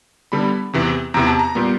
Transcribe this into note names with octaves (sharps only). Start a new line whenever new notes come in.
D3 G3 B3 B5
E2 C3 E3
E2 C3 E3 A#5
A5
A#5
A#2 G3 B3